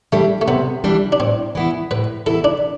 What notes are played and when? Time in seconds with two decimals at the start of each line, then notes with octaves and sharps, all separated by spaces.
0.12 E3 G3 A3 D4
0.41 A3
0.48 C3 B3
0.84 E3 G3 D4
1.12 D4
1.20 A2 C4
1.55 E3 B3 E4
1.91 A2 B4
2.26 E3 B3 E4 A4
2.44 D4